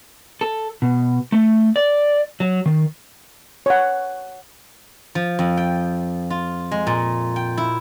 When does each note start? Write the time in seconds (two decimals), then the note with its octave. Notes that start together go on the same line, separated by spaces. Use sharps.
0.41 A4
0.82 B2
1.32 A3
1.76 D5
2.40 F#3
2.66 D#3
3.66 C#5 F#5
5.15 F3
5.39 F2
5.57 G5
6.30 F4
6.71 G#3
6.87 A#2
7.36 G5
7.57 E4